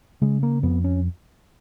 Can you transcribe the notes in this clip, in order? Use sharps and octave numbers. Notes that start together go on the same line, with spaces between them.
C#3 G#3
A#3
F2 B3
C#4